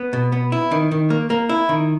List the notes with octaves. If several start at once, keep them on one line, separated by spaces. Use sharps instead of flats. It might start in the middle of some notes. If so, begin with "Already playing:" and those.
Already playing: B3
B2
B3
E4
D#3
D#3
A#3
A#3
E4
D#3